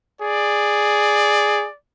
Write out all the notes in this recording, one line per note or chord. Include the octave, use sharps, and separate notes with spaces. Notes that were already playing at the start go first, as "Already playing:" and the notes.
G#4 D5